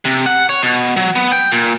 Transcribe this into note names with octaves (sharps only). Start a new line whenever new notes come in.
C3
F#5
C#5
B2
F#3
B3
G5
A#2